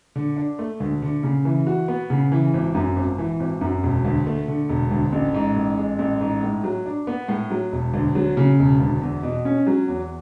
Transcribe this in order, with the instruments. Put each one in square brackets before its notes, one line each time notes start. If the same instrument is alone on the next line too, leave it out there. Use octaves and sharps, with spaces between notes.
[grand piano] D3
D4
A3
D2
D3
C#3
E3
F#4
B3
C#3
E3
G#1
F#2
G#1
E3
G#1
F#2
E1
D2
A3
D3
E1
D2
A1
G#2
A1
G#3
A1
G#2
A2
F#3
D4
B3
A2
F#3
E1
D2
F#3
C#3
E1
D2
E2
B2
C#4
F#3
E2